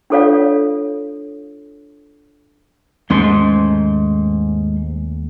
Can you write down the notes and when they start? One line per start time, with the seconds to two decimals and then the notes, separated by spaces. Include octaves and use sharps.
0.10 D4 F4 A4 C#5 D5 F5
3.10 D#2 G#2 A3 C#4 C6